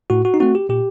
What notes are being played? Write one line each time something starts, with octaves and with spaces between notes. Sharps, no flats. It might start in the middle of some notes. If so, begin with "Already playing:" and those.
A2 F#4
F#4
D#4
A3 C4 F#4
G4
A#2 G4